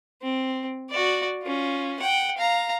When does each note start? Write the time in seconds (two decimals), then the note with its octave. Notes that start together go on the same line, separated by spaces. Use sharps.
0.22 C4
0.90 F#4 D5
1.43 C#4 F4
2.00 F#5 G5
2.37 F5 A#5